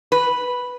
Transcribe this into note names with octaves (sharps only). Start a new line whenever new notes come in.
B4